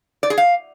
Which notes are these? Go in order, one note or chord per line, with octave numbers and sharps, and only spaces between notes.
D5
G#4
F5